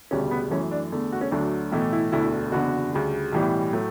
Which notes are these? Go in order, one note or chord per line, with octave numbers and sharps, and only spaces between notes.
E1 D2 C#3 G3 C#4
B3
F#2 E3 A3 C#4
D4
E2 D3 A3
F#4
C#4
D2 D3 F#3 A3 D4
B1 A2 E3 A3 E4
E4
E1 D2 D3 A3 E4
F#1 E2 D3 F#4
D2 C#3 G3
B1 A2 E3 G3
A2 F#3 A3